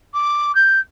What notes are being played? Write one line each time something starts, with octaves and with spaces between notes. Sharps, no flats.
D6
G6